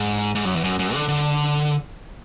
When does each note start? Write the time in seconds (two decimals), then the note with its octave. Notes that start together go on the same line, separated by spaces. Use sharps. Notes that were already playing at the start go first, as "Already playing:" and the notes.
Already playing: G#2
0.35 G#2
0.45 F#2
0.55 E2
0.64 F#2
0.79 F#2
0.94 D3
1.09 D3